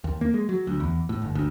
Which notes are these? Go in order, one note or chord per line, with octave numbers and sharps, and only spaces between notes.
D#2
A#3
G#3
F#3
D2
E2
A2
G1
D2